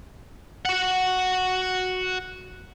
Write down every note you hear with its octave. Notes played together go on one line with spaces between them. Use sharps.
F#4 F#5